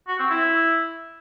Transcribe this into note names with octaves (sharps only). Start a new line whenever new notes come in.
F#4
C4
E4